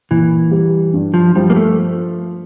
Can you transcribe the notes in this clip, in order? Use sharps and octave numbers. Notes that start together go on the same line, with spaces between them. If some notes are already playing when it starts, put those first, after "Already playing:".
A#2 E3
G3
G2
F3
F3 G3
A#3
A3